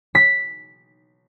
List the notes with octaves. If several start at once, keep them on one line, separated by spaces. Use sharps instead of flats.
B6